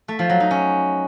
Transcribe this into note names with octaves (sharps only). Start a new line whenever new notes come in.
A3
F3
F#3
D#4
C#4